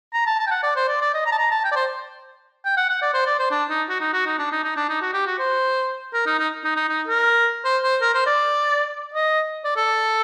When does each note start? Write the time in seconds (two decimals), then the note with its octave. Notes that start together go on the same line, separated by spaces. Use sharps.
0.14 A#5
0.26 A5
0.39 A5
0.46 G5
0.51 F#5
0.63 D5
0.76 C5
0.88 D5
1.01 D5
1.14 D#5
1.26 A#5
1.32 A5
1.38 A#5
1.51 A5
1.64 G5
1.71 D5
1.76 C5
2.65 G5
2.77 F#5
2.89 F#5
3.02 D5
3.14 C5
3.26 D5
3.39 C5
3.51 D4
3.69 D#4
3.89 F#4
4.01 D#4
4.13 F#4
4.26 D#4
4.38 D4
4.52 D#4
4.63 D#4
4.76 D4
4.89 D#4
5.02 F#4
5.13 G4
5.26 F#4
5.39 C5
6.13 A#4
6.26 D#4
6.39 D#4
6.64 D#4
6.76 D#4
6.89 D#4
7.07 A#4
7.64 C5
7.83 C5
8.01 A#4
8.14 C5
8.26 D5
9.14 D#5
9.64 D5
9.76 A4